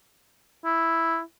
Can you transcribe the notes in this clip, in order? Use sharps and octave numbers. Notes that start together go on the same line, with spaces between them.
E4